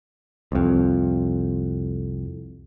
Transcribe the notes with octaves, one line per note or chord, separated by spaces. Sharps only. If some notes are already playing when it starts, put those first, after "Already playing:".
C2 F2